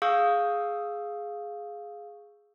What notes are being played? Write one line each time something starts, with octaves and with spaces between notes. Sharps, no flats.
G#4 F5 C#6 D#6 E6 G6